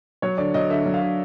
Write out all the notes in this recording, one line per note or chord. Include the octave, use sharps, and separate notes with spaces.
F#3 C#5
D3 D5
F#3 D#5
D3 E5
F#3
F5
D3